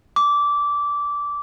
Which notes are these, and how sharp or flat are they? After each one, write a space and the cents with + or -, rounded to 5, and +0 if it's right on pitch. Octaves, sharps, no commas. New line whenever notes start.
D6 -15